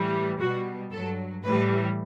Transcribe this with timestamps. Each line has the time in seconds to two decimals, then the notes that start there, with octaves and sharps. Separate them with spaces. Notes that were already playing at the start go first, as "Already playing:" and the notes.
Already playing: A2 E3 G3
0.40 B2 G3 F#4
0.92 G2 F#3 A4
1.44 A2 E3 G3 B4